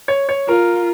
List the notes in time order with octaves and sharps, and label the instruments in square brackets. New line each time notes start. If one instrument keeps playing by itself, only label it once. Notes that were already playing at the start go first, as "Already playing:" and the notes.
[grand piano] C#5
C#5
[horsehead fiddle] F4 [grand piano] A#4